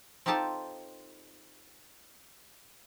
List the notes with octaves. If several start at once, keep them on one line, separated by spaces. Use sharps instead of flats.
C4 D#4 F4 G4 A4 A5